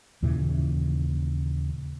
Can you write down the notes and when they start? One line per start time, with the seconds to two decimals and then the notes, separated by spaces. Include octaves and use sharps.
0.22 D#2 A#2 C#3 E3